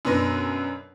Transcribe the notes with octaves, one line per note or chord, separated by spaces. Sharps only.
F#2 B2 D4 B4 C6 A#6